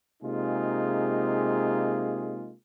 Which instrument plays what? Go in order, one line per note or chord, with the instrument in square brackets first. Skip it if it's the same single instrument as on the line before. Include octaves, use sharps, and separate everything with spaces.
[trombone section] C3 G#3 A#3 D#4 F4 G#4